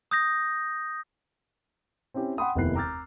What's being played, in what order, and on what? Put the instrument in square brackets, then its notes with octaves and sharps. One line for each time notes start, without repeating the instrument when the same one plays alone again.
[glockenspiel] D#6 G6 A#6
[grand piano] C4 C#4 E4 G4
F#5 G5 B5 C6 D#6
F1 D#2 B3 E4 F#6 C7
A#5 D6 E6 F6 G6 A6